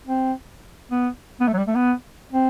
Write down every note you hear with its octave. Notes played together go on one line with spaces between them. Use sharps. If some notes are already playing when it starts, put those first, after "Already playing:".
C4
B3
B3
A3
F#3
G3
A3
B3
C4